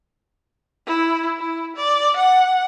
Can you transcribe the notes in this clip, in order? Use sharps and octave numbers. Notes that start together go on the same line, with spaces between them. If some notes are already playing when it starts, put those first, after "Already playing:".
E4
E4
D5
F#5